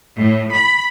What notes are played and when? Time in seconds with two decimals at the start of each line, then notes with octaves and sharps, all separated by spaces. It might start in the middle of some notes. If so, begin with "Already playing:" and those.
0.17 A2
0.54 B5